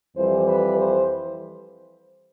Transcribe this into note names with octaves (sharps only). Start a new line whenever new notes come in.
F2 E3 G3 C5
B4
C5